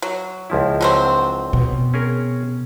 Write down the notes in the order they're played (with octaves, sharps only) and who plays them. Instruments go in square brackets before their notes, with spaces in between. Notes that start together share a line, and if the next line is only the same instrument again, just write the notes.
[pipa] F#3
[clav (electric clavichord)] C#2 F3 E4
[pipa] D3 F#3 C4
[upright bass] B2
[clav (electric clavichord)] C#4 G#4 A#4